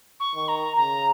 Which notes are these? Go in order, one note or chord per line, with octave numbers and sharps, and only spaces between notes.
C#6
D#3
A#5
C#3 A#5